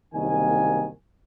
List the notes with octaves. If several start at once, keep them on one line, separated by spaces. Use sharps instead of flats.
F#1 C2 D#3 A#3 G#5